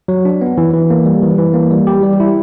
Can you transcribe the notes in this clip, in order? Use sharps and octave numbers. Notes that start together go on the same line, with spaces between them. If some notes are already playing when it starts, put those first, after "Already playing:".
F#3
D4
B3
E3
E3
A#3
G3
E3
E3
A#3
G3
G4
G3
E4